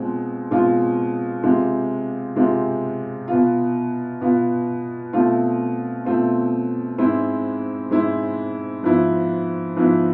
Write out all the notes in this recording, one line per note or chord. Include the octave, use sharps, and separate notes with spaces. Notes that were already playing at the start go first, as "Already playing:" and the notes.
Already playing: B2 G#3 C4 F4
B2 G#3 C4 F4
C3 G#3 C4 F4
C3 G#3 C4 F4
B2 B3 F4
B2 B3 F4
B2 A3 C4 F4
B2 A3 C4 F4
G#2 G#3 C4 E4
G#2 G#3 C4 E4
G#2 F3 B3 E4
G#2 F3 B3 E4